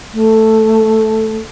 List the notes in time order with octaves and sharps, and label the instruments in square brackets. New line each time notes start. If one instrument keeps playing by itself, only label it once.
[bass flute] A3